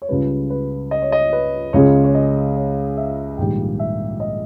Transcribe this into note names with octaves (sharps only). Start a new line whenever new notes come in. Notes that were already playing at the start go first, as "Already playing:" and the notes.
C#5
C#2 C#3 G3 B4
B4
D#5
C#5
D#5
B4
C#2 C#3 G#3 C#5
C#5
D#5
C#5
E5
A#1 G#2 D#3 G3 G5
E5
D#5